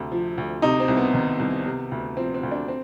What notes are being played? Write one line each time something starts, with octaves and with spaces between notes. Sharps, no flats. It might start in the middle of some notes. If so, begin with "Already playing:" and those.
Already playing: D2 C3
F3
D2
C3 D#4
C4
C2
B3
D#3
C2
C3
D2
F3 C4
C4
D2
D4
C4